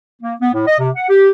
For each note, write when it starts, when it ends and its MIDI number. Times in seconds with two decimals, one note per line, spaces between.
0.22 0.34 58
0.41 0.49 59
0.54 0.65 45
0.67 0.77 75
0.80 0.90 48
0.96 1.07 78
1.09 1.30 67